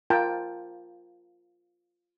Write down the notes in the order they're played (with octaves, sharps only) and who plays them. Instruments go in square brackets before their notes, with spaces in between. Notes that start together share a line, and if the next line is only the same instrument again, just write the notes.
[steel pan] F4 A#4 G5 A5